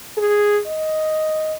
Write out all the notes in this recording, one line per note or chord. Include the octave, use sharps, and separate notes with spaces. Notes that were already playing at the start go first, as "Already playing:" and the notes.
G#4
D#5